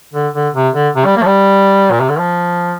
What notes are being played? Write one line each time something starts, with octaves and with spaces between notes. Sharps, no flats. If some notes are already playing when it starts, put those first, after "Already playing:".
D3
D3
C3
D3
C3
G3
A#3
F3
G3
A#2
C3
D3
F3